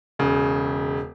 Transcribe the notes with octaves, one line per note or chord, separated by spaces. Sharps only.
E1 C#3